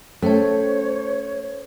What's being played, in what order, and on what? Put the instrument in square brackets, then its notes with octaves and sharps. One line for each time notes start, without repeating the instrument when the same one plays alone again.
[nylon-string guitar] A3 [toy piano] C#4 G5 A5 [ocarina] C5 [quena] C#5